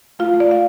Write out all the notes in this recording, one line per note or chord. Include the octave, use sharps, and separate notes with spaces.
A3 F4 F5
A3
D5
F5